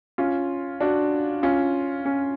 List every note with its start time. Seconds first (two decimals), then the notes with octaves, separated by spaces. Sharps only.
0.18 C#4 F4
0.81 D4 F#4
1.43 C#4 F4
2.05 C#4